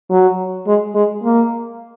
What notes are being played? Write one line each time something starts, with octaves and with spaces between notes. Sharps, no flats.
F#3
G#3
G#3
A#3